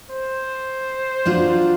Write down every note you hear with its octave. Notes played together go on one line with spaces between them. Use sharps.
C5
F#3 D4 F4